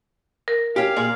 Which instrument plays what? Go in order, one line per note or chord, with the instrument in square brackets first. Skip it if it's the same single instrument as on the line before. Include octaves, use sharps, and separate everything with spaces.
[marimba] A#4
[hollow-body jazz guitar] C#4 G4 [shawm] F5
[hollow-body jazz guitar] A#2 G#4 D5